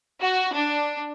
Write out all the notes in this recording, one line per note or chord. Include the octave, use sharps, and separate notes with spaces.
F#4
D4